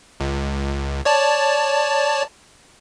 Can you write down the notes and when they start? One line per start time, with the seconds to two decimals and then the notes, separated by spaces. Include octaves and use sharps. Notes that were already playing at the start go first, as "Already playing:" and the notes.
0.20 C#2
1.05 C#5 D5 A5